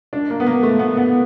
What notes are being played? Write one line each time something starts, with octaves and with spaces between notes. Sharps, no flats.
D4
A#3
B3
A#3
A3
B3
B3